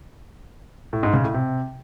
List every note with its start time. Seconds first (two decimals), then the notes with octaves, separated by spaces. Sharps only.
0.93 A2
1.03 G#2
1.13 C#3
1.24 A2
1.34 C3